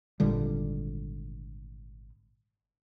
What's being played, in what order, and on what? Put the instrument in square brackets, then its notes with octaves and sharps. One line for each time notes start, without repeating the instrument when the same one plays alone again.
[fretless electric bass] G#1 A#2 D3 G3